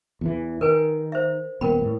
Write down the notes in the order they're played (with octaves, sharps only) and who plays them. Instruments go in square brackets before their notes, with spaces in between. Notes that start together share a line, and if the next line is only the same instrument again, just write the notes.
[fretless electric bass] E2 E3
[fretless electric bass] D#3 [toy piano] A#4 B4 G#5
[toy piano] C5 E5
[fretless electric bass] D#1 B3 [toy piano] A#4 G5 B5
[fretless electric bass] A2